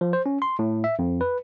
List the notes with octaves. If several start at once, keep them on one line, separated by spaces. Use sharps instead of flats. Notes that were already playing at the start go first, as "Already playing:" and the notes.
F3
C5
C#4
C6
A2
E5
F2
B4